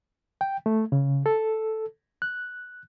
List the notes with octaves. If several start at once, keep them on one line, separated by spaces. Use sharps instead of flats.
G5
A3
C#3
A4
F#6